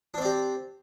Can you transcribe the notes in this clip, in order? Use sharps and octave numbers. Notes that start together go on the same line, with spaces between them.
C4 D4 G4 D5